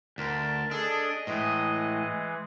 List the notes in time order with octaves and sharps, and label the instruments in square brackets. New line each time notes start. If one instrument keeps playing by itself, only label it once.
[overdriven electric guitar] D2 [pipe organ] A#4 A5
[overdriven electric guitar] D4 [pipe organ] G#4 A4 [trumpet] D#5
[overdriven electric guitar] A2 [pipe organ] E3 G#3